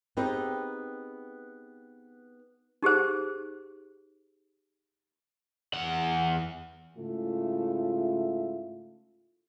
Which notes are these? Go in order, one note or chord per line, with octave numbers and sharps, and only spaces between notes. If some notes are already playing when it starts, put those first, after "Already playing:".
B3 C4 D#4 G4 G#4 B4
D#4 G4 G#4 C5
E2 F#5
G#2 C#3 A3 E4 F4